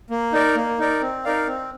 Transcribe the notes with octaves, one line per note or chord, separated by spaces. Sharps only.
A#3
D#4 A#4 D5
A#3
D#4 A#4 D5
C4
D#4 A#4 D5 F5
C4